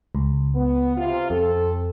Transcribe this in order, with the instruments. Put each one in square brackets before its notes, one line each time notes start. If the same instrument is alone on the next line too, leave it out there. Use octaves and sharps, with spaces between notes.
[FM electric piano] C#2
[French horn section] B3
C3 F4
[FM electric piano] F2 [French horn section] C4 A4